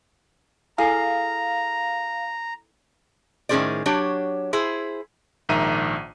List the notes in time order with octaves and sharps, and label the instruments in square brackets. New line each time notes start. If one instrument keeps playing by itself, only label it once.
[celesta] E4 A4 C7 [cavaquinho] G#4 [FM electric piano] F5 [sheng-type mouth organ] A#5
[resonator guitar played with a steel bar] A2 D#3 C#4 G#4 C5 D5
F#3 D4 G4 C#5
E4 G#4 C5
[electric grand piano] A#1 G#2 D#3 E5 A#5 D#7